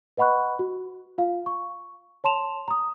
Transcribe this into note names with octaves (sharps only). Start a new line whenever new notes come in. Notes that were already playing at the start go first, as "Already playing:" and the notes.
B4 D#5 F#5 B5 C#6 F#6
F#4
F4 F5
C#6
C#5 A5 C6 E7 F7
A#5 D#6